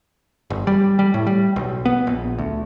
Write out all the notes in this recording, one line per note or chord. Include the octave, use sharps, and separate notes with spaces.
G1
G3
G3
A2
G3
B1
B3
A#1
D2